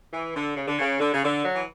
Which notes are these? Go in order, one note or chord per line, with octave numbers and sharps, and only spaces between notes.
E3
D3
C#3
D3
C#3
D3
C#3
D3
F#3
E3